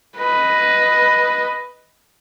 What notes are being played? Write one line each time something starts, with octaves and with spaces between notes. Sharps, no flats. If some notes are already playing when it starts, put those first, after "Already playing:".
B4 D#5